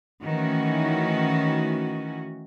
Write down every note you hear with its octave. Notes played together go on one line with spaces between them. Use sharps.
D#3 E3 A3 C#4 F#4